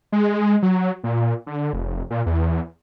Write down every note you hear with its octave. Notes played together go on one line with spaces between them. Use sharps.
G#3
F#3
A#2
D3
F1
A#2
E2